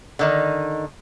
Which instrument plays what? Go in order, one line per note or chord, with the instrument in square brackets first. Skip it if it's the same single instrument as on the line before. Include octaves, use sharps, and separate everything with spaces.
[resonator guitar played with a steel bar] D3 D#3 D#4